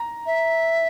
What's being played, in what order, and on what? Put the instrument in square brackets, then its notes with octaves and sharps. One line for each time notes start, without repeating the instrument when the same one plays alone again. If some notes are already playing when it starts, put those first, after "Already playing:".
Already playing: [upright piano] A#5
[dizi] E5